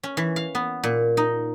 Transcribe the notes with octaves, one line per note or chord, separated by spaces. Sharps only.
C#4
E3
F5
B3
A#2
D#4